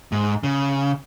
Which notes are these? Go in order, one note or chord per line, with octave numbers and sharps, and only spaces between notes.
G#2
C#3